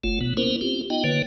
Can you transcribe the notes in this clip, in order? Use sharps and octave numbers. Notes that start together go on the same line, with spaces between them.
F#1 A3 F4
B2 B3
A#3 B3 C#4 E4 A#4 C5
C4 F4 G4
B3 D#4 F4 D#5 G5
D3 A#3 B4 C#5